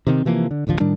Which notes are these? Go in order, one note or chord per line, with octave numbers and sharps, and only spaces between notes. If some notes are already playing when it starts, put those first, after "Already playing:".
C3 D#3 B3 C4
C3 E3 F3 A#3
D3
D1 A1 D3 F3
A2 D#3 G3 D4